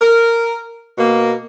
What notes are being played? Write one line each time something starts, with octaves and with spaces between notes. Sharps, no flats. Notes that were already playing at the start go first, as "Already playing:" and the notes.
A#4
B2 A#3